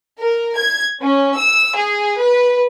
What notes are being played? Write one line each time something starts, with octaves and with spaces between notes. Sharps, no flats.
A#4
G#6
C#4
E6
G#4
B4